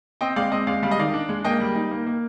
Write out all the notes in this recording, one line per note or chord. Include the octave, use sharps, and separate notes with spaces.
C4 D#5 G5
G#3 D5 F5
C4 D#5
G#3 D5 F5
G3 F5
D#5
D#3 D5 F5
D4
G#3
A#3 D#5 G5
G3
D#4
A#3
A#3